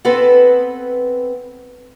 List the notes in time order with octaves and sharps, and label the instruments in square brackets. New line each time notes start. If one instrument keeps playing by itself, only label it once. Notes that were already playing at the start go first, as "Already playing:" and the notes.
[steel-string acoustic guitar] B3 C4 A4 B4